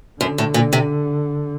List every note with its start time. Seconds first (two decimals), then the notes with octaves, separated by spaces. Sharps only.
0.21 F#2 D3
0.38 A2
0.54 A#2
0.73 C3